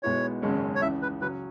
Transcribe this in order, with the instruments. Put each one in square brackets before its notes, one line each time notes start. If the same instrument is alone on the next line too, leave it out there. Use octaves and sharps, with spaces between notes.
[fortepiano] B1 B2 G#3 B3 E4 [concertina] C#5
[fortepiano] G#1 F#2 C#3 G#3 C#4
[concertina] C#5
[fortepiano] C#2 C#3 E3 [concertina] E5
[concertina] B4
[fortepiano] C#3 F#3 C#4 [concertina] B4